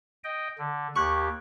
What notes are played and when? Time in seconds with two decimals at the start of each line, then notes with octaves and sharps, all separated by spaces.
0.24 D#5 G5
0.58 D3
0.95 D#2 G4 C#6 F#6 G#6